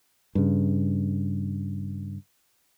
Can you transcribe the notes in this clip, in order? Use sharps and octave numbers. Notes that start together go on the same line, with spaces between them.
G2 C#3